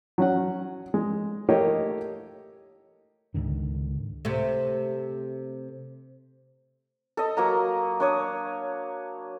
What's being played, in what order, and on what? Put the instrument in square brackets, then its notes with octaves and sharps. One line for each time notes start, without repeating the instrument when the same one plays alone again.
[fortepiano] F#3 C#4 F#5
G#3
A3 A#3 G4 C#5 D#5
[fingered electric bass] C#2 G#2 D3 D#3
[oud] C3 A3
[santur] A4 D#5
F#3 A#3 A#5
D4 C#5 D#6